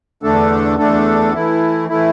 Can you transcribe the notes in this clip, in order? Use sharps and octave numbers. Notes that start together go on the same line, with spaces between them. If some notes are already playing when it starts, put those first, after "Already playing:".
E2 D3 A3 D4 A4
E2 D3 A3 D4 A4
E3 A3 E4
E3 A3 E4